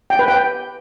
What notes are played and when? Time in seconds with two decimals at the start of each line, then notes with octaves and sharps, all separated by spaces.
0.10 G5
0.19 B4
0.28 G5